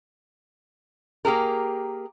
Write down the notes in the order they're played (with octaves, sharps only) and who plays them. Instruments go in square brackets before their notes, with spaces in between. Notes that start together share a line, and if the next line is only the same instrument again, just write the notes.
[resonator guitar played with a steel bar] A#3 G4 G#4 A#4